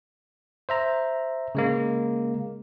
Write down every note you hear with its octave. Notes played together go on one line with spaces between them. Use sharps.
C5 E5 A#5
C#3 G#3 A#3